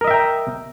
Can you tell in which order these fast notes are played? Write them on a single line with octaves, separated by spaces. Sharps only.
A#4 D#5 E5 G5 A#5